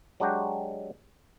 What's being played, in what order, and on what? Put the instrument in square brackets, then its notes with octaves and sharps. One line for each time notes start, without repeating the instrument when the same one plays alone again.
[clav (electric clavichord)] F#3 G#3 D4 F#4 G4